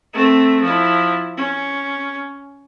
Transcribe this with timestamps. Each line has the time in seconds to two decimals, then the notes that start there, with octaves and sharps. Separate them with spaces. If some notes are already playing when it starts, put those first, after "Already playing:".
0.14 A3 C4
0.61 F3 E4
1.37 C#4